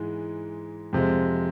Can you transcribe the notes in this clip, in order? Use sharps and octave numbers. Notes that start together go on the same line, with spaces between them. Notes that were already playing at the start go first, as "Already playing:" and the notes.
Already playing: G#2 E3 G#3
F2 C3 F3 G#3